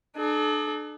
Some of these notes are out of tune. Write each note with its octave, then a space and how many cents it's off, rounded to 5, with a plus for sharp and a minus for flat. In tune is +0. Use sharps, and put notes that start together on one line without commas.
D4 +40 A4 -40